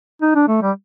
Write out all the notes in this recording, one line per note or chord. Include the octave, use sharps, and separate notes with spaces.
D#4
D4
A3
G3